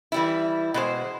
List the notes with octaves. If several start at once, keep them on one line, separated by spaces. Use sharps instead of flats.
E3 G3 E4
B2 G#3 C5